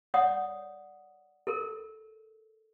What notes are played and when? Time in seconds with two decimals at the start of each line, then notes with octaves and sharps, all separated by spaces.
0.14 C#5 D5 F#5 D#6
1.47 A4 A#4